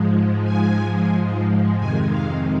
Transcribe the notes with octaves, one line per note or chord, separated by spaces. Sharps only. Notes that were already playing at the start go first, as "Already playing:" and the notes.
Already playing: G#2 F3 G#3
G#5
F2 C3 D#3 G#3 G#5
F5